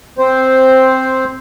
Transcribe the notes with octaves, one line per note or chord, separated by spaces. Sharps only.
C4 C5